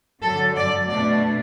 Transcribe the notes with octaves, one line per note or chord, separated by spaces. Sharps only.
F#2 D3 F#3 A4
D5
B2 A3 D4 D5